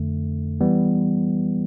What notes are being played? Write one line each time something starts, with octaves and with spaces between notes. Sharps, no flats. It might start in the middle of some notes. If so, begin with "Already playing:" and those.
Already playing: F2 D3 A3
E3 G3 B3